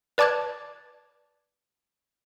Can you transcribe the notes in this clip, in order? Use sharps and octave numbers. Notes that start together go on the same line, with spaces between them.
B4 D5 A5 D6 F#6 G#6